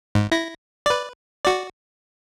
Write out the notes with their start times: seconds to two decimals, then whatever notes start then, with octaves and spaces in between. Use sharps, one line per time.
0.15 G#2
0.31 E4 A#6
0.86 B4 D5
1.45 F#4 D5